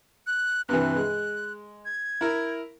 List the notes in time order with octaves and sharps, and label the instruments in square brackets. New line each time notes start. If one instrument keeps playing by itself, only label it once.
[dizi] F#6
[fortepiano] G2 C3 E3 [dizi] F#6
[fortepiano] G#3
[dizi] G#6
[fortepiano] E4 A#4